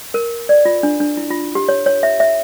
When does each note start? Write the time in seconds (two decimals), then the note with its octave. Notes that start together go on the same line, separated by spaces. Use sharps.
0.14 A#4
0.49 D5
0.65 F4
0.83 D4
1.00 D4
1.17 E4
1.30 F4
1.55 G4
1.69 C#5
1.86 C#5
2.03 E5
2.20 E5